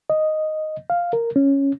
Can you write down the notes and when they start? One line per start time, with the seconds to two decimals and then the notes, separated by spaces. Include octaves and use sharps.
0.10 D#5
0.90 F5
1.13 A#4
1.36 C#4